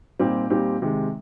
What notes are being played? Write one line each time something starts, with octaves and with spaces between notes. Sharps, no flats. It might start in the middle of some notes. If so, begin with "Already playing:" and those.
A#2 G3 C4 D#4 G4
A#2 G3 C4 D#4 G4
C3 D#3 G#3